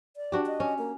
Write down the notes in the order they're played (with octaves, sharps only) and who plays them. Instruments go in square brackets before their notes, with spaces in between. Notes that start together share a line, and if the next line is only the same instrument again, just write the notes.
[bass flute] D5
[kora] D4 F#4 G4
[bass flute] D#5
[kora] C#4
[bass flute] A#3